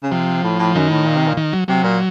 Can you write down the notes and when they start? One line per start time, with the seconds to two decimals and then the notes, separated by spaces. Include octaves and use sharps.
0.03 C#3
0.12 C3 F3
0.44 A2
0.59 A2
0.75 F#2 D#3
0.90 A2
1.06 A#2
1.16 C3
1.27 A#2
1.37 D#3
1.53 F#3
1.68 C3 F#3
1.84 A#2